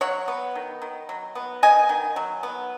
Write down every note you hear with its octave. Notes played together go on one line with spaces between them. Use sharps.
F#3 C#5 F#5
B3
D#3
D#3
F#3
B3
D#3 D#5 G#5
D#3
F#3
B3